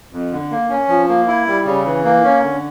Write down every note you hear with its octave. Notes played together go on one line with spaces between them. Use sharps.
F2
D3
A#3
C#4
F3
A#3
E4
G3
C#3
E3
A#3
C#4
D3